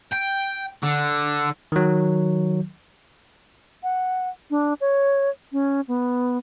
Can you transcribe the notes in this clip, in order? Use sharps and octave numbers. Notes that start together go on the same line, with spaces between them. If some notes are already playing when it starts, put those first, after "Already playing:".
G5
D3
D#3 F#3
F#5
D4
C#5
C#4
B3